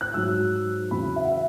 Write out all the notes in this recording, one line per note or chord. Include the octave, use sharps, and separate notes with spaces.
F#6
G#2 F#3 E6
E2 C#3 F#3 B5
E5
F#5
E5